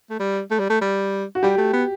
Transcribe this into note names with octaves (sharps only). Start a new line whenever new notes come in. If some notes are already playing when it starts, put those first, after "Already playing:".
A3
G3
A3
G3
A3
G3
F#4
G3 G4
A3
B3